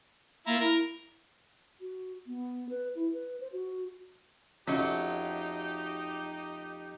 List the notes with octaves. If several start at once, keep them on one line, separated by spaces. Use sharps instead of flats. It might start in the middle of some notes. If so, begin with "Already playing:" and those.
A#3 E4 F4 A#5
E4 A#4
F#4
B3
B4
E4
B4
C5
F#4
F2 C#3 F#3 A3 C#4 D#4 G4 D#5